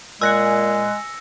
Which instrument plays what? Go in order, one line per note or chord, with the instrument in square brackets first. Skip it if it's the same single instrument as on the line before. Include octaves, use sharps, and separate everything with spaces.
[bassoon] A#2 [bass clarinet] G#3 [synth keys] G#5 F#6 [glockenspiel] E6 A#6 C#7